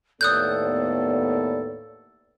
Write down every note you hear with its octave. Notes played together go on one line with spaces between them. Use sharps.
D#2 A2 B3 A4 D5 D#6 F#6 G6